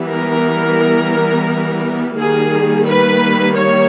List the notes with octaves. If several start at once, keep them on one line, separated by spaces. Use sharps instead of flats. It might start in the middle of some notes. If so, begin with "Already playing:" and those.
Already playing: E3 G3 B3
A#4
D#3 G3 A#3 G#4
B4
C#5